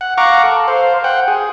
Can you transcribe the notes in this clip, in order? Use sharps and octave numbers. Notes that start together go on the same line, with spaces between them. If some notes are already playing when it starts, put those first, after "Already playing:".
F#5
F5 F#5 A#5 C#6 D6
A4
C5 F5
F#5 G5
G#4